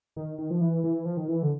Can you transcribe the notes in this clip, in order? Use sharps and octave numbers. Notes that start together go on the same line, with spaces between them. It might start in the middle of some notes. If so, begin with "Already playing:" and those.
D#3
D#3
F3
E3
E3
F3
D#3
E3
D3